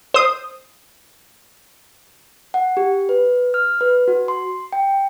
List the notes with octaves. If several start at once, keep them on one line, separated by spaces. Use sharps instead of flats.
C5 D#6
F#5
G4
B4
F6
B4
F#4
C6
G5